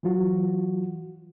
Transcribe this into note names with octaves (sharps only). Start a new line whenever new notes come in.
E3 F#3 F4 F#4